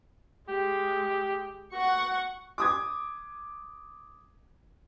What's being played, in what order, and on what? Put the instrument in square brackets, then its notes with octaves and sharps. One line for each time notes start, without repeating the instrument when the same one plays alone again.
[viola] G#3 [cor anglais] G4
[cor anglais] F#4 [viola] F#5 C#6
[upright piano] D6 D#6 G#6